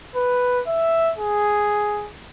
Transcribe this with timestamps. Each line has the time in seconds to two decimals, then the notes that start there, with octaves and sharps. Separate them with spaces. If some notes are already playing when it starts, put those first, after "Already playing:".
0.16 B4
0.67 E5
1.18 G#4